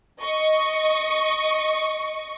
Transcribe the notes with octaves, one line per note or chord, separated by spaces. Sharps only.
D#5 C#6